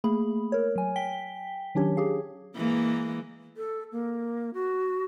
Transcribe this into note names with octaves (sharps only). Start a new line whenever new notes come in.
A3 A#3 G#4 B5
A#4 C#5
F#3 G#5
G5 B6 G7
D#3 F#3 C#4 D4 G4 C#5
G4 G#4 F5
E3 G#3 A#3
A4
A#3
F#4